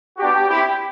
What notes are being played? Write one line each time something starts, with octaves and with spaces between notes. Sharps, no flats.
B3 D4 F#4 G4
C4 E4 G4